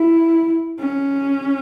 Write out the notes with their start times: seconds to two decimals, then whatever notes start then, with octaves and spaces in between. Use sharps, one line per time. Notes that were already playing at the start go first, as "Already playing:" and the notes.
Already playing: E4
0.79 C#4